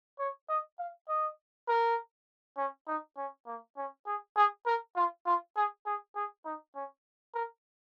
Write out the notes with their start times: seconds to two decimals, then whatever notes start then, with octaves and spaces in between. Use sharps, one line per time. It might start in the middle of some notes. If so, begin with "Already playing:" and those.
0.19 C#5
0.49 D#5
0.79 F5
1.09 D#5
1.69 A#4
2.57 C#4
2.87 D#4
3.17 C#4
3.47 A#3
3.77 C#4
4.06 G#4
4.37 G#4
4.66 A#4
4.96 F4
5.26 F4
5.56 G#4
5.86 G#4
6.16 G#4
6.45 D#4
6.75 C#4
7.35 A#4